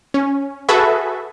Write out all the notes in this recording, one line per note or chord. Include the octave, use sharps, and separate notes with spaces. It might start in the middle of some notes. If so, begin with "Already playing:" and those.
C#4
F#4 G#4 A4 B4 E5